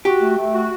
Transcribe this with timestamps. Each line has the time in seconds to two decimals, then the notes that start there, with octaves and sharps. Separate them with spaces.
0.05 F#4 G4
0.21 A3
0.37 A3
0.53 F#4